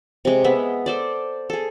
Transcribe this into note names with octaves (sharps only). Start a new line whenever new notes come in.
C3 G#3
G#3 B3 E5
A4 C5 D5
G#4 A4